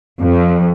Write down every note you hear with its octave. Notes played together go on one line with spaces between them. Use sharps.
F2